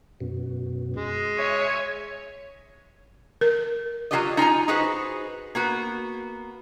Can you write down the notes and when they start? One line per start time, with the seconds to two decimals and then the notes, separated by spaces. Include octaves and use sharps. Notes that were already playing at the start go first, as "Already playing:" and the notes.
0.20 F#2 B2
0.97 G#3
1.38 C#5 E5 G#5
3.41 A#4
4.11 F#3 G#3 F4 G4 D5 D#5
4.37 D#4 F4 G#5 A#5
4.68 D#4 F#4 G#4 B4 C5
5.55 A#3 B3 F#4